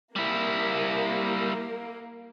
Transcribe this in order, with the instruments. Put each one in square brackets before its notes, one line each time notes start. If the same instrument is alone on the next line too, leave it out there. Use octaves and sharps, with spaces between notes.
[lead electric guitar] G3 E4 [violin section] A#3